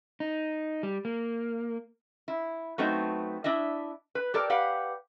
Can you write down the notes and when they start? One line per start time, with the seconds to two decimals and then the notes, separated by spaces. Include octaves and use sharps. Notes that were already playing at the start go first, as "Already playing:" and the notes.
0.20 D#4
0.83 G3
1.05 A#3
2.28 E4
2.78 F#3 A3 B3 C4 D#4
3.44 D4 E4 D#5 E5
4.15 B4
4.34 G4 A4 A#4 D5
4.50 G4 B4 F5 F#5